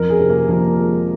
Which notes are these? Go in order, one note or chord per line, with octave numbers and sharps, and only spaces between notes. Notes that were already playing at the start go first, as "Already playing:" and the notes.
Already playing: F2 A#4
G#4
C3
A#3
F3 A#3
G#3